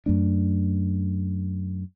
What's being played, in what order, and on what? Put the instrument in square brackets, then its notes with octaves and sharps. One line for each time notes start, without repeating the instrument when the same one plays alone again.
[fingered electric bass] F#2 A3 D4